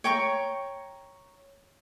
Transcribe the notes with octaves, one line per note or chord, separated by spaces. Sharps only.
C#5 G5 A#5 C#6